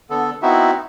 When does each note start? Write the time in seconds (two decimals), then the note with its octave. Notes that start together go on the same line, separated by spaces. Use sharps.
0.10 D3 B3 A4
0.42 B3 C4 D#4 E4 F#4 E5